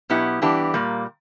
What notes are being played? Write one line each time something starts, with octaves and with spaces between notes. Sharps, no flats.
B2 F#3 B3 E4 G4
G2 E3 B3 D4 G4
A#2 G3 A#3